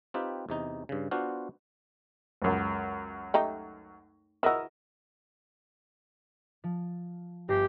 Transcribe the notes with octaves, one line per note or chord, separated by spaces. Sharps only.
C4 D#4 F4 G4 B4
E2 C3 D#4
G2 C#3
B3 D4 F4 F#4 C5 F5
C#2 F#2
A3 D#4 G4
E4 F#4 A#4 D#5 E6
F3
G1 G4 A#6 C7